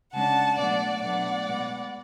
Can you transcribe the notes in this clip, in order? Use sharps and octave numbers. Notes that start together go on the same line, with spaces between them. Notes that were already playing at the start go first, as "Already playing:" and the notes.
C#3 G#3 D4 F#5 A5
B2 F#3 A3 D4 D5 F#5
B2 F#3 A3 D4 D5 F#5
B2 G#3 B3